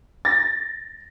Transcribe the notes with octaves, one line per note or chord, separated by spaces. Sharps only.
A6 A#6